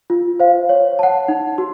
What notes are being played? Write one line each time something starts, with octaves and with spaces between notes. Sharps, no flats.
F4
C5 F5
C#5
F#5 A5
D#4
F#4